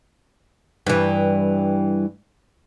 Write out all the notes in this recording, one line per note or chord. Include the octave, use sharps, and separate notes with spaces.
G2 E3